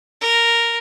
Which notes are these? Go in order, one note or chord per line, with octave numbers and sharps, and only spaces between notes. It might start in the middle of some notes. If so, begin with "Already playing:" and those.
A#4